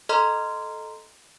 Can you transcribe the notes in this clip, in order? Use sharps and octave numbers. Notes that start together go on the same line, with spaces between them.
A4 D#5 A#5 C6 F6